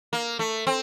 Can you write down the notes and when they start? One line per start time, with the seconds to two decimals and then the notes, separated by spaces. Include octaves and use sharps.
0.13 A#3
0.39 A3
0.67 C4